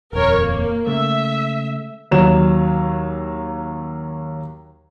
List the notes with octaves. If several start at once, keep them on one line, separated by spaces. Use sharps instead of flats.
D#1 F2 A#4 C#5
A#3
C#3 G#3 A3 E5
D#2 F#3 E7